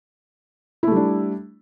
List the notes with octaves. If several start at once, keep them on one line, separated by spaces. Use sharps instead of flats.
G3 A3 D4 E4